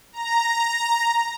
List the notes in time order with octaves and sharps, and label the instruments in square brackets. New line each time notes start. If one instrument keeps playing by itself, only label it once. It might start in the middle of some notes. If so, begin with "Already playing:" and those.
[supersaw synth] A#5